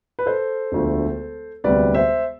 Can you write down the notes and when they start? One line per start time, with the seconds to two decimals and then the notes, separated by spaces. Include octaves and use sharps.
0.19 B4
0.26 A4 C5
0.72 E1 D2 D3 F3 A3
1.64 E1 D2 C3 G3 B4 D5
1.94 C5 E5